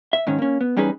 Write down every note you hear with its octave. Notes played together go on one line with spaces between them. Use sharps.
E5
G#2 D#3 C#4
A#3 C#4
B3
E2 G3 C#4 D#4 G#4 B4